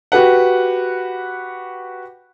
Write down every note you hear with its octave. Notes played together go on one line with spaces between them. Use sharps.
F#4 G4 B4 F#5